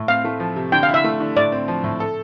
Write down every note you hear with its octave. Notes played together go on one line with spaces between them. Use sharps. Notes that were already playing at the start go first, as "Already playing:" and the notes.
Already playing: A2
C4 F5
A3
F3
C3
D3 G5
F5
E4
E5
A3
D3
A2 D5
C4
F3
A2
A4